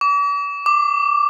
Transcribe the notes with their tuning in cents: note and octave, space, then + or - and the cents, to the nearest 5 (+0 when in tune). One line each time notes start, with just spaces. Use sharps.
D6 -45
D6 +10